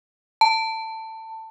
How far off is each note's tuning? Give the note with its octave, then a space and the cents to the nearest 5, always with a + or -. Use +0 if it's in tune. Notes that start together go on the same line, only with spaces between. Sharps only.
A5 +20